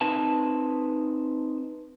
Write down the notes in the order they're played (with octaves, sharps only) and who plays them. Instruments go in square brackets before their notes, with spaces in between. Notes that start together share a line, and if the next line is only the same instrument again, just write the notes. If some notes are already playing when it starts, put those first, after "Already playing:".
[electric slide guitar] C4 D#4 B4 A5